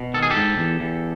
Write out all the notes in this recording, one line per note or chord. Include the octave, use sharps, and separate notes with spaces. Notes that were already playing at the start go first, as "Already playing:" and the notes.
Already playing: B2
D#3 A4
G#4
G4 A4
G#2
E2
E2